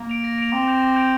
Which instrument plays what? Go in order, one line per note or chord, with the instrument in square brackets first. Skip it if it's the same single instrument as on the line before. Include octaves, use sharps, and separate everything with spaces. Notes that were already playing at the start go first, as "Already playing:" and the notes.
Already playing: [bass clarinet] A#3
[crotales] D7 F7
A#6
D7 F7
[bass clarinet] C4 [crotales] D6
[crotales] G6 D7 F7
D6
G6 D7 F7